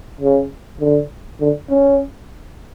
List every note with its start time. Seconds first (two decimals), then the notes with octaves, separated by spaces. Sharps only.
0.21 C#3
0.80 D3
1.40 D3
1.70 C#4